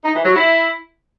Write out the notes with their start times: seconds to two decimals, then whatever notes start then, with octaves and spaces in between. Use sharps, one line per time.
0.04 D#4
0.15 E3
0.25 F#3
0.36 E4